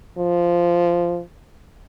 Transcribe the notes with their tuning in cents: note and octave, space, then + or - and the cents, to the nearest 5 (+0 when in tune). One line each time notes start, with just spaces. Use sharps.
F3 -10